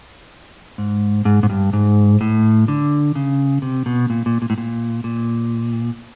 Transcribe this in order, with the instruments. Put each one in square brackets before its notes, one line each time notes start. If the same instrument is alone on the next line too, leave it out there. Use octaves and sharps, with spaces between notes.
[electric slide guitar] G#2
G#2
G#2
G2
G#2
A2
D3
C#3
C3
B2
A#2
A#2
A#2
A2
A#2
A#2